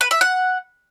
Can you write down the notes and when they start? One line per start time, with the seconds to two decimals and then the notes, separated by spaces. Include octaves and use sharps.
0.01 B4
0.11 E5
0.21 F#5